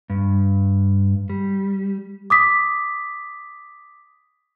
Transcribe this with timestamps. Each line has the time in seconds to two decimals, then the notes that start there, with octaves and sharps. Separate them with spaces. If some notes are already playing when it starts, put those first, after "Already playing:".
0.10 G2
1.30 G3
2.30 D6 D#6 B6